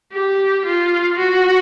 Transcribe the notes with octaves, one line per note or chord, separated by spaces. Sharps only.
G4
F4
F#4